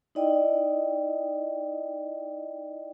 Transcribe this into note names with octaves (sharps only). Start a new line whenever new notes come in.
D#4 E4 D5 D#5 G5